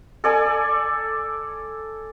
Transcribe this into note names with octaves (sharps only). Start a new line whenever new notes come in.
A4 D5 G#5